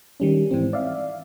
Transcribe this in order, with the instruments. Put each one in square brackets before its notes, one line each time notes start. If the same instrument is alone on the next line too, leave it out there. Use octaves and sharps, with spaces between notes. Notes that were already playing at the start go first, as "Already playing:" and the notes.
[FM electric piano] D#3 G3 C#4
G#2 E3 C4
D5 E5 F5